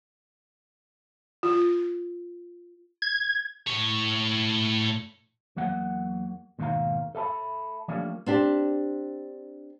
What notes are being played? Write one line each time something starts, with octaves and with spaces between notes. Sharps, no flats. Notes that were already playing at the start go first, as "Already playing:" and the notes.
F4
G#6
A2 C#5
E2 F#3 A#3 F#5
D#2 G#2 B2 D#3 F5 A#5
A4 E5 A5 B5
F3 G3 A3 A#3 C#4 D4
C4 D4 G4